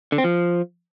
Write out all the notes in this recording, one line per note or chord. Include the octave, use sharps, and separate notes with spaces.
D3
C4
F3